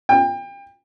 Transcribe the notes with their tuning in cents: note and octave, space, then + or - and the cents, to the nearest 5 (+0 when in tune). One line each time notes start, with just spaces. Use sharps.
G5 +30